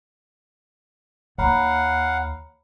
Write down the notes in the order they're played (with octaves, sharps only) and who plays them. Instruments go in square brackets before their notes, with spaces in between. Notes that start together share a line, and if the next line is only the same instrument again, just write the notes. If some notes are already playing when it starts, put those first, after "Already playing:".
[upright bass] D#2 [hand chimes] C#5 A#5 B5 [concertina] F5 F#5